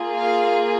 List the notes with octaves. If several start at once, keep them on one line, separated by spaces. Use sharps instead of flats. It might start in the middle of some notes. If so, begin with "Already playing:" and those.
Already playing: A#3 F4 G#4
F5